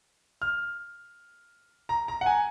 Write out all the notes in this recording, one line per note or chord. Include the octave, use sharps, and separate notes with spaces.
F6
A#5
A#5
F#5
G#5